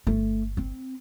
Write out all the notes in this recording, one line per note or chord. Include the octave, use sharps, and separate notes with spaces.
G1 A3
C4